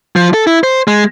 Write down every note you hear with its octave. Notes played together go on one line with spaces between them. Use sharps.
F3
A4
E4
C5
G#3